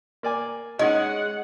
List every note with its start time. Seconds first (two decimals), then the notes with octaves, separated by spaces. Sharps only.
0.23 A#3 D5 G#5
0.79 G#3 C#4 D#4 D#5 F#5